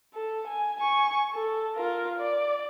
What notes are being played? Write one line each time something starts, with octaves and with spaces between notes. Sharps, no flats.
A4
G#5
G#5 C#6
A4
F4 A#4
D5